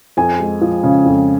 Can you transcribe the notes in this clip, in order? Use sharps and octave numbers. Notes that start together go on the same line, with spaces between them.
F2 G#5
G#3
F3
C#3
F2